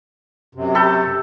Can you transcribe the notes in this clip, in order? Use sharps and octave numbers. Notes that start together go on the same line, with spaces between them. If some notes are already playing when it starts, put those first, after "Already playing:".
F#2 C3
G4 A4 B5 G6